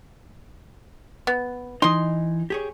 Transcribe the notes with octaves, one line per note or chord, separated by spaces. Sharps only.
B3
E3 D#4 D#5 C6
G4 G#4 C#5